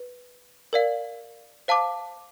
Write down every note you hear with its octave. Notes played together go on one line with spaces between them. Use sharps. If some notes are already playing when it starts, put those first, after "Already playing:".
Already playing: B4
A#4 D5 F5
C5 F5 A5 D6